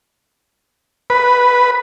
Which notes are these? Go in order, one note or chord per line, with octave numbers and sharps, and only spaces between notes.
B4